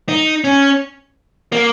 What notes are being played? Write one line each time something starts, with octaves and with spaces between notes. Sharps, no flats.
D#4
C#4
A#3